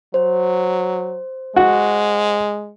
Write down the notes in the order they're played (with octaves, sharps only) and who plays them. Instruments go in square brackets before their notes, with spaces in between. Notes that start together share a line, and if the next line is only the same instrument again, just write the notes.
[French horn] F#3 [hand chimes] C5
[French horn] G#3 [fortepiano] F#4